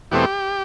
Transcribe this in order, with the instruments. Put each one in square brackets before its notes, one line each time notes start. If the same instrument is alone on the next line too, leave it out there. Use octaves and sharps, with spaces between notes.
[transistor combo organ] E2 B2 A3 C4 G4